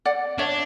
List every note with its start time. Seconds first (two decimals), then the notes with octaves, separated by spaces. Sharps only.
0.05 D5 F#5
0.38 D4 C#5 E5